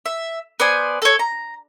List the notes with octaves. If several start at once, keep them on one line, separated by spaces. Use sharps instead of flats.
E5
B3 C5 D5 G#5
A4 C#5
A#5